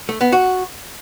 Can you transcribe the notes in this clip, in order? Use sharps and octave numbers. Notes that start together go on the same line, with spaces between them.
A3
B3
F#4